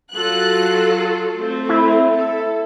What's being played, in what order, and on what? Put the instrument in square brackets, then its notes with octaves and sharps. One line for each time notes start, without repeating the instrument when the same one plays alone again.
[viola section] F#3 F4 A4 [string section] F#6
[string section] A3 C4
[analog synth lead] E4
[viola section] A4